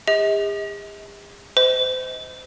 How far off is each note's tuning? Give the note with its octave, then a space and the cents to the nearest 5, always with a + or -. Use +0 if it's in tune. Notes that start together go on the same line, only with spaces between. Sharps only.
G#4 -45 D#5 +40
C5 -30 D#5 +30